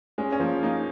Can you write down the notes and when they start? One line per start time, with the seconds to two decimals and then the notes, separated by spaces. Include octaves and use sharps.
0.18 G#3 C#4
0.32 C#4
0.40 F3 A#3
0.63 A#3 D#4